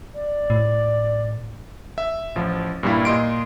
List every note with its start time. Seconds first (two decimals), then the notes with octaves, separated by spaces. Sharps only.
0.15 D5
0.50 A2
1.98 E5
2.36 A1 F3
2.83 G2 A#2 G3 A#3 E4
3.05 A#2 D#5 C6 D7